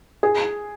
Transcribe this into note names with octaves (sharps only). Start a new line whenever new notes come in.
G#4